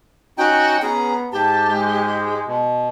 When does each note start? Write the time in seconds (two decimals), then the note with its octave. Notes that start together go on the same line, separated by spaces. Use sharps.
0.38 C#4 D#4 F#4 G5
0.82 B3 C#4 G#4 A#5
1.32 G#2 G4 A5
1.68 G#3
2.47 B2